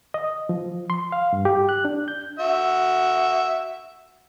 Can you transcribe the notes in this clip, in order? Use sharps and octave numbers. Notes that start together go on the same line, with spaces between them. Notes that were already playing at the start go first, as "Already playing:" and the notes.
D#5
F3
C6
F5
G2
G4
F#6
D4
G6
F#4 E5